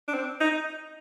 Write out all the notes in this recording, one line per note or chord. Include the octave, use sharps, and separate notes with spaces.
D4
C4
D#4